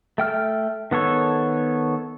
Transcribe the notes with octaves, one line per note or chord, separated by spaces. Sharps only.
A3 G5 F6
D#3 B3 A4 C#5